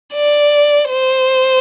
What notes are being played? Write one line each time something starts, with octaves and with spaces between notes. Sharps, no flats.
D5
C5